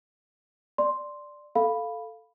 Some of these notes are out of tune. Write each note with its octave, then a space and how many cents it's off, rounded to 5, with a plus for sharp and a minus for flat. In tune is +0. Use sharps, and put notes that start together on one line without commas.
D5 +0 C6 +0
A4 +0 F5 +0 B5 +0